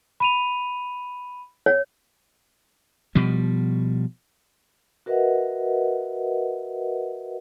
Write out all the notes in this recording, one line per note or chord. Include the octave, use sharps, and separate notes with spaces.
B5 D#7 F7
C#5
B2 F3 G3
F#4 A#4 B4 D#5 E5 F#5